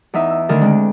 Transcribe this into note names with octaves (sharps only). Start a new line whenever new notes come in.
E2 D#4 E5
E6
D2 D3 D#3 A#4 A5
G#3 C4 D4